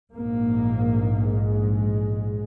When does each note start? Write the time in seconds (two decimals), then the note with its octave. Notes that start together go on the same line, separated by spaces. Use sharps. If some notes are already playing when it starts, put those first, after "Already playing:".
0.13 A#1 G#2 A#3
1.21 G#3